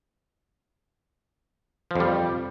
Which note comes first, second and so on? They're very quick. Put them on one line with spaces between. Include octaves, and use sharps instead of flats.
F3 F2 G3